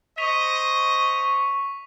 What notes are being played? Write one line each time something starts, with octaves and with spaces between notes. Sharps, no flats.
C5 D#5 C#6 B6 D#7 F7